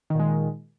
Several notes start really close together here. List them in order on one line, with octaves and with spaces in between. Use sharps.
D#3 A#2 G#3